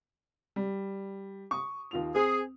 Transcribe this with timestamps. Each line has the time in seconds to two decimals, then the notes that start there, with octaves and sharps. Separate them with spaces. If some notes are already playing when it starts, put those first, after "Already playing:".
0.56 G3
1.51 C#6 D#6
1.91 D#2 F4 F7
2.15 C4 G#4